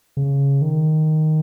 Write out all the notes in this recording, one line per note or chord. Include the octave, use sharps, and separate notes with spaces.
C#3
D#3